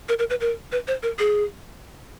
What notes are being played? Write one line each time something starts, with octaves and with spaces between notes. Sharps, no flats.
A#4
A#4
B4
A#4
B4
C5
A#4
G#4